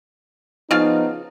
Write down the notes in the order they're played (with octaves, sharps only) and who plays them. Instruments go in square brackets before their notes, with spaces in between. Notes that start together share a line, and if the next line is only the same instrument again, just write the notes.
[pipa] C#3 F4 F5 [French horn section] F3 B3 D#4